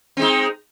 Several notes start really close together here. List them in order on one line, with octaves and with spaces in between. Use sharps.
C4 G#3 D#4